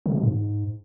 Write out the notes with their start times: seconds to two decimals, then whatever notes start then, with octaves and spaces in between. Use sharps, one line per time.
0.06 D3
0.12 C3
0.18 B2
0.24 G#2